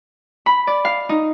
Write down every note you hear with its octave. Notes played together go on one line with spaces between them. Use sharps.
B5
D5
F5
D#4